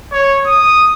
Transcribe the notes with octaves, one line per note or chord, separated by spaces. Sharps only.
C#5
D#6